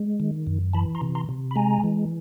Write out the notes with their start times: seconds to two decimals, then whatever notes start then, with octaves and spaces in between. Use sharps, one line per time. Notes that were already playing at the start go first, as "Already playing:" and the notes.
Already playing: G#3
0.20 D#3
0.47 F#2
0.73 E3 A5 B5
0.95 A#5 C6
1.02 C3
1.15 A#5 C6
1.29 C3
1.51 B5
1.56 G#3 G#5 A#5
1.83 E3